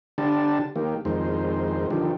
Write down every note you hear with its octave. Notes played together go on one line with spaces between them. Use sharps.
D3 D4 G4 A5
D#3 A#3 G4
F2 D#3 G#3 C5
D3 D#3 F3 G4